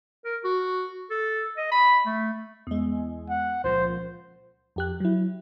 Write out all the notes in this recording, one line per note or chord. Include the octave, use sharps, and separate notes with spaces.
A#4
F#4
A4
D#5
B5
A3
E2 G#3
F#5
C#2 A#2 F3 C5
F2 G4 F#6
F#3 E4